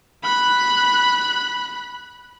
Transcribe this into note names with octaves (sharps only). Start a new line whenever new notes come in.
B5 F#6